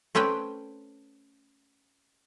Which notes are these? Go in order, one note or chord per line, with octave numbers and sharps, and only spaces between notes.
A3 C4 C#4 B4 G5